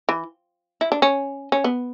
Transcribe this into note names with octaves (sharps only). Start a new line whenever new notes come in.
E3
E4
D4
C#4
C#4
B3